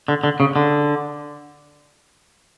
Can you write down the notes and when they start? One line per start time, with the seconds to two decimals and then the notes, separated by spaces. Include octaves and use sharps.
0.08 D3
0.24 D3
0.40 C#3
0.56 D3